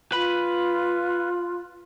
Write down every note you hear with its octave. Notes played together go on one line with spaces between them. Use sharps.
F4 B4 B5